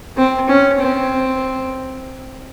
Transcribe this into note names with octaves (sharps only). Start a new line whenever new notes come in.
C4
C#4
C4